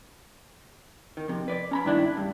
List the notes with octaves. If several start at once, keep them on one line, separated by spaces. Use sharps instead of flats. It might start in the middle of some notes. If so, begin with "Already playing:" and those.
D#3
F2 C3
B4 D5
C#4 A#5 B5
G2 D#3 D4 E4
G2